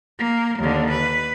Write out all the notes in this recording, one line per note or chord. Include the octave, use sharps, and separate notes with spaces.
A#3
D#2 D3
B4